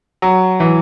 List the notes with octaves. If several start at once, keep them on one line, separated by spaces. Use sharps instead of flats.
F#3
E3